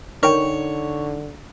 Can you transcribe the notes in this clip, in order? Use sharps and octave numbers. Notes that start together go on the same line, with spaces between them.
D3 D#4 A#4 C#5 G5